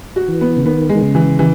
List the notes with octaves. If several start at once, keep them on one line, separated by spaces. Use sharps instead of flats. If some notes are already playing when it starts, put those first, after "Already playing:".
F#4
E3
B3
C#3
D#3 B3
G#3
D#3
C#3
E3
E3